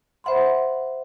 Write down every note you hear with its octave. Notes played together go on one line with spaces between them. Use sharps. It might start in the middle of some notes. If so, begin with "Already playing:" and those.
C5 E5 F#5 B5 C6